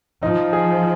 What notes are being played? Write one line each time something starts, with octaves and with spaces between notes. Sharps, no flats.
F3 D#4
G#4